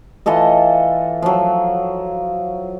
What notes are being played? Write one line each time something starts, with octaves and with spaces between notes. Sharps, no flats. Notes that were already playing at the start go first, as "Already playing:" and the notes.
E3 F4 A4 D#5
F3 F#3